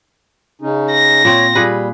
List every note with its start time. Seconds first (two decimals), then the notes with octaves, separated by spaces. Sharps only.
0.62 C#3 C#4 D#4
0.92 A#6
1.25 A#2 C4 C#5
1.55 A#2 G3 G#4 B4